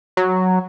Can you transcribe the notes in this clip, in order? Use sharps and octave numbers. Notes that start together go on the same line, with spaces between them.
F#3